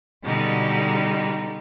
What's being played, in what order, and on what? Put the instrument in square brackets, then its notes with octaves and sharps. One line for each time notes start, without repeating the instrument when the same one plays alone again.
[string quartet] B2 D3 G3 G#3 D#4